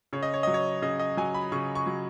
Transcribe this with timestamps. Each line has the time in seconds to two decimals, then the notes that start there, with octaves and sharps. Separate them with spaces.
0.13 C#3 C#5
0.23 D#5
0.34 C#5
0.43 F#3 D#5
0.54 C#5
0.82 C#3 D#5
1.00 D#5
1.17 F#3 G#5
1.34 B5
1.52 C#3 C#6
1.75 C#6
1.87 F#3